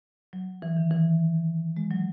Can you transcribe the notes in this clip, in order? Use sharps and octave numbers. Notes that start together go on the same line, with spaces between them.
F#3
E3
D#3
E3
G#3
F#3